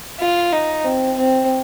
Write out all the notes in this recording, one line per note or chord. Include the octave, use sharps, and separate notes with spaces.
F4
D#4
C4
C4